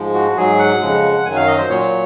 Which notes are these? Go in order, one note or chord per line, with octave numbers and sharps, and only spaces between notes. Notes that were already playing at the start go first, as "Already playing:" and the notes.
Already playing: G#2 F3 G#3
F#4
G#2 F#3 G#4
F#5
F2 C#3 F3 G#3
F#2 D#3 F#3 G#5
F5
D#5
C5
A#2 F#3 C#5